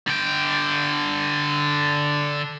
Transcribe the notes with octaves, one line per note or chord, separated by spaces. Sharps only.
D3 G5